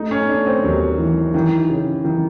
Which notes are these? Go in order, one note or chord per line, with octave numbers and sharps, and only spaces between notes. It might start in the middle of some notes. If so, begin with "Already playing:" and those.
Already playing: A3 D#4
C#4
A3 D4
C4
D#2 F#3
E3
D#3 E3
C#3
D#3 E3